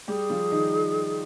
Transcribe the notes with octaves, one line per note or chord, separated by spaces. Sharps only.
G3 G4 G#4
F3 F4
D#3 D#4